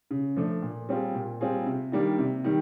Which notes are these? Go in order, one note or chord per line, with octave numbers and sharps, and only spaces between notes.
C#3
F3 A3 D4
A#2
G3 C4 F4 G#4
A#2
G3 C4 F4 G#4
C3
D#3 G3 A#3 D4
C3
D#3 G3